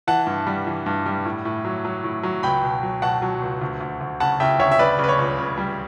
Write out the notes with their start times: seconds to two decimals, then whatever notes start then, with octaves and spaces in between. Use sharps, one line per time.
0.07 E3 F#5 A5
0.27 G2
0.47 G3
0.67 E3
0.86 G2
1.06 G3
1.25 A2
1.45 A2
1.65 F#3
1.85 F#3
2.04 A2
2.23 F#3
2.43 C#2 G5 B5
2.63 B2
2.83 F#3
3.02 B2 F#5 A5
3.22 F#3
3.42 C#2
3.62 D2
3.81 D2
4.01 D2
4.20 C#3 F#5 A5
4.40 C#3 E5 G5
4.59 D2 C#5 E5
4.71 E5
4.79 C#3 B4 D5
4.99 C#3
5.04 B4
5.08 C#5
5.19 C#2
5.38 C#3
5.58 G3